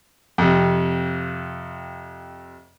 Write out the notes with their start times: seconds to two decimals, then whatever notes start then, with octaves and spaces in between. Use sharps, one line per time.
0.38 F2 C3